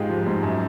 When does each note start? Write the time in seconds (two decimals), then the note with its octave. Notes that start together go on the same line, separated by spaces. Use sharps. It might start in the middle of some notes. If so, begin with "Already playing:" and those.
Already playing: G#2 G#3 F4 G4
0.09 F3
0.26 G#2
0.43 F#2